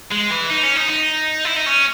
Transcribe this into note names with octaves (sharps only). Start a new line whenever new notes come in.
G#3
E3
D#4
C#4
D#4
D#4
E4
D#4
C#4